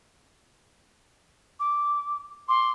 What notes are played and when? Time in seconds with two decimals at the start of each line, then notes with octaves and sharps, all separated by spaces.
1.60 D6
2.48 C6 D6